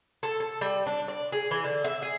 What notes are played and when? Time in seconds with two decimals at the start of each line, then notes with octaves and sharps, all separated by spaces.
0.23 A4
0.40 A4
0.61 G3
0.86 D4
1.08 D5
1.32 G#4
1.51 E3
1.64 D3
1.84 E5
2.02 G#4